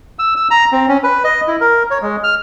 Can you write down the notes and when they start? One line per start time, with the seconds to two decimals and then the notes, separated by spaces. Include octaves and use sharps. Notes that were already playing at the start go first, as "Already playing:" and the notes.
0.19 E6
0.36 E6
0.51 A#5
0.72 C4
0.88 C#4
1.04 B4
1.24 D#5
1.47 E4
1.61 A#4
1.91 C#5
2.02 G#3
2.24 F6